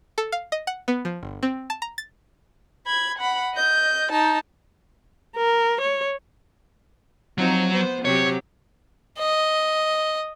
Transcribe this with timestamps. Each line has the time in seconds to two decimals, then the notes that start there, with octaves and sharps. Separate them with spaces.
0.18 A4
0.32 F5
0.52 D#5
0.67 F#5
0.88 B3
1.05 F3
1.23 G1
1.43 C4
1.70 A5
1.82 A#5
1.98 A6
2.86 B5 G#6
3.18 F#5 B5
3.55 D#5 G6
4.11 D#4 A5
5.37 A#4
5.81 C#5
7.38 F3 F#3 C4 D#4
7.70 B3 C5
8.05 C3 F#3 G4 C#5
9.18 D#5